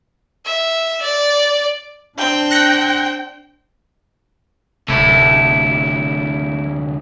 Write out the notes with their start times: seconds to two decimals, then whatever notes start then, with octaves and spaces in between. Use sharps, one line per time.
0.45 E5
1.01 D5
2.18 C4 D4 G5
2.51 F#6 A#6 C#7
4.88 D1 D2 C3 A3 E4